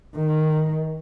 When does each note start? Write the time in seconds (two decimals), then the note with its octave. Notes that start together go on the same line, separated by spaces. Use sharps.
0.15 D#3